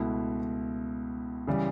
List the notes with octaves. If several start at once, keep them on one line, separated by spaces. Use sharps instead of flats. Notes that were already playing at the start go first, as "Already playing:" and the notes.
Already playing: C#2 B2 A3 E4
C#3 E3 G3